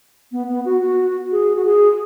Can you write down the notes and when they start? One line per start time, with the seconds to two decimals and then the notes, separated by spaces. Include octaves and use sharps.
0.32 B3
0.49 B3
0.65 F#4
0.81 F#4
1.32 G#4
1.56 F#4
1.65 G#4